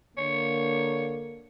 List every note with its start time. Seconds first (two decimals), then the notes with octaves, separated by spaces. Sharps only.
0.17 D3 A#3 C#5